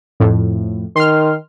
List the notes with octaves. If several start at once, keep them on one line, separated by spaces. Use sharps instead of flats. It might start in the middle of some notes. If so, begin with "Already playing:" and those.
F2 A2
D#3 C6 F6